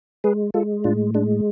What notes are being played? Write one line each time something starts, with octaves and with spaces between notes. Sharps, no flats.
G#3 G#4 B4
G#3 F4 A4
A2 D4 F4
G#3 D4